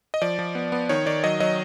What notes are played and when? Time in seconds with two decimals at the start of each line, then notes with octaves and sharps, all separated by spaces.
0.14 D#5
0.22 F3 D5
0.39 F3
0.55 B3
0.72 B3
0.89 D#3 C#5
1.06 D#3 D5
1.24 F#3 D#5
1.40 F#3 D#5